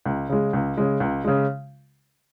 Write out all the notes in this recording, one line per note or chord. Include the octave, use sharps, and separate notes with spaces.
C#2
C#3 G#3
C#2
C#3 G#3
C#2
C#3 G#3